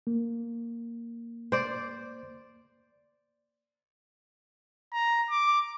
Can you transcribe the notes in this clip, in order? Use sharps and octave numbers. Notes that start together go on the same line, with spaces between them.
A#3
C5 D5
A#5
D6